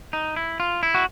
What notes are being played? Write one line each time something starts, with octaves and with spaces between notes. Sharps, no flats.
D#4
E4
F4
E4
F#4